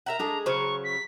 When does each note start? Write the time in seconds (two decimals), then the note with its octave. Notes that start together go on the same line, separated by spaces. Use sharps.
0.06 A#4 E5 F#5 A#5
0.19 G#3 D4 G#4 A4
0.46 C#3 F#3 C5 F5 C#6
0.83 B6